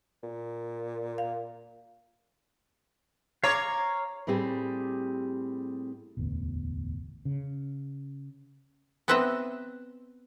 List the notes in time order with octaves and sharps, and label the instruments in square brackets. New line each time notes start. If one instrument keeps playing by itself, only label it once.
[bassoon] A#2
[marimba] F5
[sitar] C#5 [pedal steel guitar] F5 A#5 D6
[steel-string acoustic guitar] A2 G3 C4 G4 G#4
[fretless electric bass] E1 A1 D2 B2
C#3
[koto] B3 C4 B4 D#5 E5